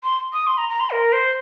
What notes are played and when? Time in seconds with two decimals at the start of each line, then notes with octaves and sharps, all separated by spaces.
0.03 C6
0.33 D#6
0.47 C6
0.58 A#5
0.69 A#5
0.80 C6
0.91 A#4
1.13 C5